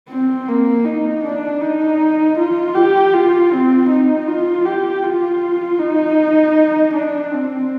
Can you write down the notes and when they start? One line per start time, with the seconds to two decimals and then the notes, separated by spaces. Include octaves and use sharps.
0.09 C4
0.48 A#3
0.85 D#4
1.24 D4
1.61 D#4
2.38 F4
2.75 G4
3.14 F4
3.52 C4
3.90 D#4
4.28 F4
4.65 G4
5.04 F4
5.79 D#4
6.94 D4
7.32 C4